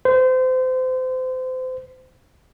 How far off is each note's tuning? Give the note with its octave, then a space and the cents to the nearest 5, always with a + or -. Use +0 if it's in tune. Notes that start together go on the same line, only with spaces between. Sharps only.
C5 -30